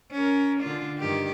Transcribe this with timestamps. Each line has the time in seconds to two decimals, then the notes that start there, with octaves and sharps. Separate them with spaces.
0.12 C#4 A#4
0.61 D3 D4 F4
0.99 G2 D#3 G4